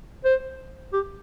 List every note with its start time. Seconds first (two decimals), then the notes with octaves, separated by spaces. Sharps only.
0.24 C5
0.93 G4